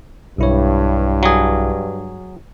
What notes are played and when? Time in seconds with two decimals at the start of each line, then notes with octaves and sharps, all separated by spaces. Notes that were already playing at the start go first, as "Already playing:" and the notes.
0.38 B1 G2 E4 C#5
1.23 F#3 G#4